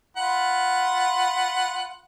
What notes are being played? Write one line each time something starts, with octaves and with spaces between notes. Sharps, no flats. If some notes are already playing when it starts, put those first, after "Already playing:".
F4 F#5 B5